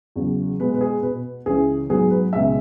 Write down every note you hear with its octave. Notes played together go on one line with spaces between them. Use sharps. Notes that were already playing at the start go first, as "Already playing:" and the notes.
E2 C#3 F#3
B2 G#3 B3 B4
B4
G#4
B2 B3 B4
C#2 C#3 E3 C#4 G#4
G#2 F#3 B3 G#4
B4
C#2 B2 G#3 E5